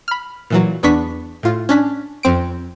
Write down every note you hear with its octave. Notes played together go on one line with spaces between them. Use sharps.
B5 F6
A#2 E3 F#3
E2 B3 D4 C#6 B6
A2 F4
C#4 D4 B6
F2 C4 D7